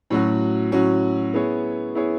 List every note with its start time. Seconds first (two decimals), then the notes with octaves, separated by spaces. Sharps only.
0.10 A2 F#3 C#4 F#4
0.72 A2 F#3 C#4 F#4
1.34 B3 E4 G#4 C#5
1.95 B3 E4 G#4 C#5